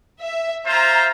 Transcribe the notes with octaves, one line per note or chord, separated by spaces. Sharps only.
E5
F4 C5 E5 A#5